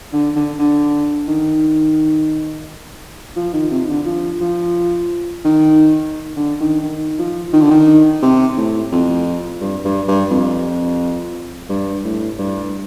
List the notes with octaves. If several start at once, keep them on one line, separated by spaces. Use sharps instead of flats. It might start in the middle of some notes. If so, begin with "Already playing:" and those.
D3
D3
D3
D#3
F3
D#3
C3
D3
F3
F3
D#3
D3
D#3
D#3
F3
D#3
D3
D#3
C3
A2
F2
G2
G2
G2
F2
G2
A2
G2